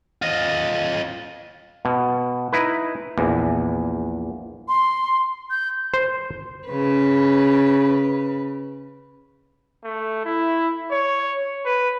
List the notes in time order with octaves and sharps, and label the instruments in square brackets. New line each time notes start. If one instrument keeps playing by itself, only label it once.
[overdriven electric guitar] F4 D#5
[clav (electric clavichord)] B2
D#4 E4 B4
A#1 E2
[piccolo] C6
G6
[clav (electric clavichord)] C5
[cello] C#3 B4
[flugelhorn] A3
E4
C#5
B4